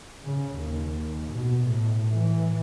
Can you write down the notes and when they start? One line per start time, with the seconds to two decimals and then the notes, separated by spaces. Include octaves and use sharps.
0.24 C#3
0.57 D#2
1.33 B2
1.67 A2
2.10 E3